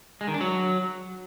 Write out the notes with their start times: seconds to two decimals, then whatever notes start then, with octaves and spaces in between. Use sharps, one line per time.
0.21 G#3
0.27 D#3
0.34 D4
0.41 F#3